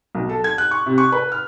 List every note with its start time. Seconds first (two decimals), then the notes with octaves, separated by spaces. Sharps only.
0.15 B1
0.29 A4
0.44 G#6
0.58 F#6
0.71 C#6
0.86 C3
0.98 C#6
1.12 B4
1.32 F6